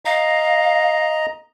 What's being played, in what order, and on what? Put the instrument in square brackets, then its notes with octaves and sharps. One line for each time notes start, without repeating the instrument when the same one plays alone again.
[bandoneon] D#5 A#5 [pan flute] F5